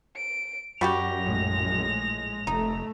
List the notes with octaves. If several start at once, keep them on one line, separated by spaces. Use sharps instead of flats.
D7
F#2 G3 F#4 G4 A#6 F7
A#1 A2 G#3
F1 A3 D#4